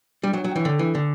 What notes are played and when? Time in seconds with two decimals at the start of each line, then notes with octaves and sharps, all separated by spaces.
0.23 G3 D4
0.33 F#3
0.38 C#5
0.44 F#3
0.52 E3 G5
0.65 D3 A4
0.79 E3 D4
0.94 D3 D4